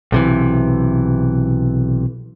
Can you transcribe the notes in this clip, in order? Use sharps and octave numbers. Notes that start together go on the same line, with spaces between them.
B1 C3 E3